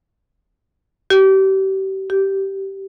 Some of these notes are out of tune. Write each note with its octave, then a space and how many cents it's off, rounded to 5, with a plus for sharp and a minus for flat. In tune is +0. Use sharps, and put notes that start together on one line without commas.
G4 -35
G4 -15